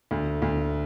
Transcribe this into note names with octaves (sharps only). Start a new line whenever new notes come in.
D2
D2